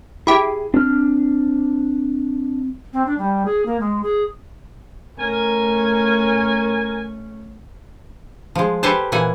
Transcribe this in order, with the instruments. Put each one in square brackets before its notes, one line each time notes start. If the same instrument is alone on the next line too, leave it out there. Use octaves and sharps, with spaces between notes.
[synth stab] E4 G4 [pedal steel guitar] G#4
[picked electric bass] C4 [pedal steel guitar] D4 F6
[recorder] C4
D4
G3
G#4
A#3
G#3
G#4
[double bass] A3 C#4 [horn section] A#4 G#5
[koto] F3 G#3
G4 A4 B4 C5 G#5 A5
A#2 E3 F#5 G#5